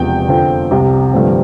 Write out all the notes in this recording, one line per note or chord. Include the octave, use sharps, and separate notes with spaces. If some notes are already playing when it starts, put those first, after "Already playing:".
Already playing: E1 E2 C3 F3 G5
F2 D3 F3 C4
C2 C3 G3
G2 D3 F3 A3 C4